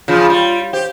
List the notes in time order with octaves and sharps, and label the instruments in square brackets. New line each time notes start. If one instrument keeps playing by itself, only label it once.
[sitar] C#3 F3 [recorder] F4
[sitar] G3
[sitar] G4 [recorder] C5